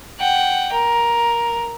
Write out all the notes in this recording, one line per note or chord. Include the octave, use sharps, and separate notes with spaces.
F#5 G5
A#4